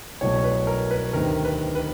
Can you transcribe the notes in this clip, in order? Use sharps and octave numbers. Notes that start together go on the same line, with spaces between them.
C2 B2 F#3 A3 C#5
B4
A#4
B4
D2 C3 D#3 A#4
B4
B4